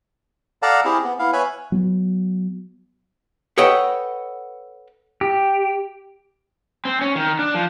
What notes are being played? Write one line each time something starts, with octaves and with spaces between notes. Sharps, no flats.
A4 D5 F5 F#5 A5 A#5
C4 E4 G4 G#4
B3
B3 E4 F5
B4 C#5 E5 G#5 B5
F#3 B3
A4 B4 C#5 D#5 F#5 G5
G4
C4
C#4
D#3
D4
F3